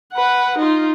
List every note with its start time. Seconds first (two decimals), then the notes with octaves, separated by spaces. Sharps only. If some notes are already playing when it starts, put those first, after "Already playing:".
0.13 B4 F#5
0.58 D#4 F4